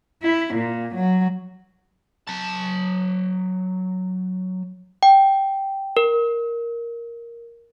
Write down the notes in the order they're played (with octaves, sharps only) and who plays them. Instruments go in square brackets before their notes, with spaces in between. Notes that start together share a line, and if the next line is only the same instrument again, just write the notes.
[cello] E4
A#2
F#3
[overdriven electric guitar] F#3 A5
[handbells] G5
A#4